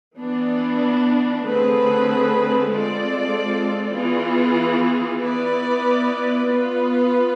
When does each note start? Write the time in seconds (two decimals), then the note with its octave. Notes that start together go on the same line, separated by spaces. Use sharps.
0.19 E3 B3 D4
1.44 D3 A3 C4 G#4 B4
2.70 G#3 C4 F4 A4 D5
3.95 E3 B3 F4 G#4
5.21 B3 E4 B4 D5
6.47 B3 F4 B4